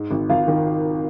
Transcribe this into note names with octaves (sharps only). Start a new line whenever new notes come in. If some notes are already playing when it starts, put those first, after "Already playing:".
Already playing: G#2
G#1
G#1 F4 F5
D#3